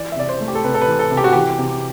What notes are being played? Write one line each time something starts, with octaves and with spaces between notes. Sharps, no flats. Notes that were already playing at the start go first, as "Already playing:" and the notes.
Already playing: E3 D5
E5
C3 D5
C5
A3
G4
A4
C3 B4
A4
B4
E3
A4
C3
G4
F#4
E3 G4
C3